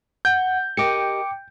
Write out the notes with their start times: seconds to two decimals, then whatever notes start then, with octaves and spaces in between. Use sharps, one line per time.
0.25 F#5 G6
0.77 G4 A#4 D#5 G5 D6 C#7